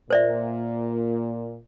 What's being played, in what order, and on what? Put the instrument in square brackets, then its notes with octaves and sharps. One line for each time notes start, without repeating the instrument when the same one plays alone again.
[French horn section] A#2 [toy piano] C5 D5 E5